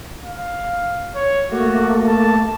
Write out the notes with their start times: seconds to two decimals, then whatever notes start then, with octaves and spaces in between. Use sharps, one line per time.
0.24 F5
1.15 C#5
1.51 A3 A#3 F#4
2.07 A5